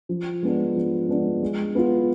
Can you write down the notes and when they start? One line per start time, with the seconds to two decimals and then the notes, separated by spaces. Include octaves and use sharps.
0.09 F3
0.43 G#3 B3 D4
0.76 F3
1.09 G#3 B3 D4
1.42 G#3
1.75 B3 F4